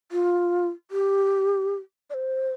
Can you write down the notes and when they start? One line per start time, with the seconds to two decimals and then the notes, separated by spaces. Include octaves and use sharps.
0.12 F4
0.91 G4
2.10 D5
2.14 C5